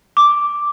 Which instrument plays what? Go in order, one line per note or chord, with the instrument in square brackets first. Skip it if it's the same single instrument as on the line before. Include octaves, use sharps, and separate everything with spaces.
[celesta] D6